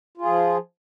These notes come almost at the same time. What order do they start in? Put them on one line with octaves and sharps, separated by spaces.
F4 G#4 F3